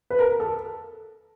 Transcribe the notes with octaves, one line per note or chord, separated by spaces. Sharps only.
B4
A#4
A4